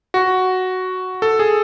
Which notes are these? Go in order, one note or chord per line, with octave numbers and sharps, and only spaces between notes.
F#4
A4
G#4